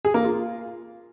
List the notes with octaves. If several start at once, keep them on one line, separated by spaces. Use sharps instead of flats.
G#4
A#3
F4